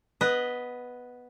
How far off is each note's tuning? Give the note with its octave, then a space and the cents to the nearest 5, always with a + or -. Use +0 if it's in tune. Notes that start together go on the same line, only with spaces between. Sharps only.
B3 +0 B4 +0 D#5 +10